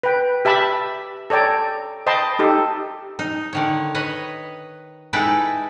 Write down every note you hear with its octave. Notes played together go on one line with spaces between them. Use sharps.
B4 G5
G4 E5 A5 B5
A4 C#5 D5 G5 A#5
C5 D#5 G5 A5 B5 C6
D#4 G4 A4
D#4
D3 D#3 C#5
B4 C#5 D#5
G#3 D#4 E4 A4 B4 G5